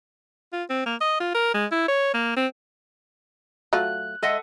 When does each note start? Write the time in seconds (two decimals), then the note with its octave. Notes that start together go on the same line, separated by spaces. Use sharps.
0.53 F4
0.70 C4
0.86 A#3
1.01 D#5
1.20 F4
1.35 A#4
1.54 G#3
1.72 E4
1.88 C#5
2.14 A#3
2.36 C4
3.73 F#3 A3 F4 F#6
4.23 G#3 A4 D#5 E5 F#5